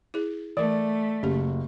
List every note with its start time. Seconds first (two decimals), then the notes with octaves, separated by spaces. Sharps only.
0.14 E4 G#4
0.57 E3 A3 A#4 D5
1.23 F#1 C#4 G4